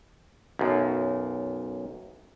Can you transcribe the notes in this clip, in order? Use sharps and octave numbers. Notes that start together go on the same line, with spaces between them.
B1 F#2